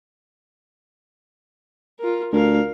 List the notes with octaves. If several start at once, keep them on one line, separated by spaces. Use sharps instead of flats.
F4 A#4
D2 A#4 F5